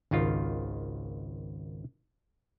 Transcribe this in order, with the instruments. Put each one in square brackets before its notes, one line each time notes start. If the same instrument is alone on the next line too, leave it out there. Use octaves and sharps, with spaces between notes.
[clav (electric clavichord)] G#1 C#2 D#3 F4